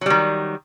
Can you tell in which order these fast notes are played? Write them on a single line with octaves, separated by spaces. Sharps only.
F#3 G3 D#3